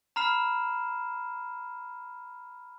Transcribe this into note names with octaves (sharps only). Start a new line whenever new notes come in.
A#5 B5 F6 C7 E7